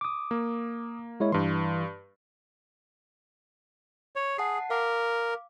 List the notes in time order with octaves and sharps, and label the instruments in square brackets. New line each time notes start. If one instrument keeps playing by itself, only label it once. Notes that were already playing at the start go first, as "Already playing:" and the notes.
[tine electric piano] D6 D#6
[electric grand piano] A#3
[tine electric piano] G#3 E4 C#5
[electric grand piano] G2 C6 [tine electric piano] E3
[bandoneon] C#5
[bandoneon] G#4 [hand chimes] F#5 A5 C7
[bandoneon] A#4 [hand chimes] F5 D6